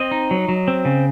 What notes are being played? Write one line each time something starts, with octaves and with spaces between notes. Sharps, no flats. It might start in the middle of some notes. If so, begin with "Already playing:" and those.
Already playing: C4 D#5
D#4
F#3
F#3
C4
C#3